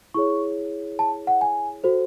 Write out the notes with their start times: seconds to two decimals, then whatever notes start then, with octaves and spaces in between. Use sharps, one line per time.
0.14 E4 G#4 C#5 C#6
0.99 A5
1.27 F#5
1.41 G#5
1.84 F#4 A4 C5